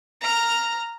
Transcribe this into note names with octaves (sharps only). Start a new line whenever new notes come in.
A#5 F6